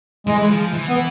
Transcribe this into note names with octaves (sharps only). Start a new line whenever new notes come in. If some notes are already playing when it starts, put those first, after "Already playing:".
E3 G#3
F3
E3
B3